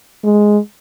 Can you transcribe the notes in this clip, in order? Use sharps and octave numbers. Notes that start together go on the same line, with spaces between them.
G#3